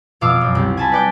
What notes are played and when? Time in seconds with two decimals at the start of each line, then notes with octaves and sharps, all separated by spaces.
0.21 F2 B2 F5 D6 E6
0.41 F#2
0.55 C2 G4
0.77 G#5 A5 B5
0.92 B4 D5 G5